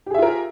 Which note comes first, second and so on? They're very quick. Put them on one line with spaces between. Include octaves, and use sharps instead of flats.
G4 G#4 E5 F4 A#4